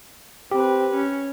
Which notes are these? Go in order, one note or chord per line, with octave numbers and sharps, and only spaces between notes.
C4 G4 B4
C#4